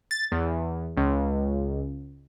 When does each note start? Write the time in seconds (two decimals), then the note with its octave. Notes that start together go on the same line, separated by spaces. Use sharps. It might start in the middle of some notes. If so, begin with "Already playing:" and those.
0.11 A6
0.32 E2
0.97 C#2